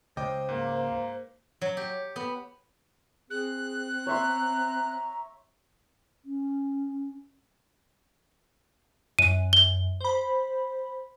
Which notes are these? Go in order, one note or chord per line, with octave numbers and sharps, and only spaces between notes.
C#2 C5 D#5 G5 D6
G#2 A#3
F#3
G4
B3
C4 G#4 F#6
C#5 E5 A#5 C6
C#4
F#2 D#7
G7
C5 B5